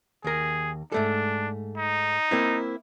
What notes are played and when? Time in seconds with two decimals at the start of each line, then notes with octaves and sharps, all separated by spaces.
0.24 D#2 G#4 A#4
0.92 G#2 A3 D4 A4
1.77 D#4
2.31 A#3 C4 E4